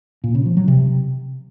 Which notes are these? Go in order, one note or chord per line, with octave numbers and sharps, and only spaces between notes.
A#2
C#3
F3
F#3
C3